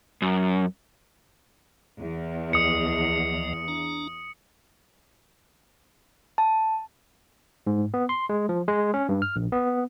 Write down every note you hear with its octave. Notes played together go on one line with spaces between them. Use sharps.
F#2
E2
D2 F3 D#5 D#6 C#7
D4 A#5
A5
G#2
B3
C6
G#3
F3
G#3
C#4
G2
F6
A#1
B3